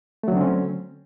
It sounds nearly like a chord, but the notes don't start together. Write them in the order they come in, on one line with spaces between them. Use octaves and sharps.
A3 F#3 D3 C4 C#4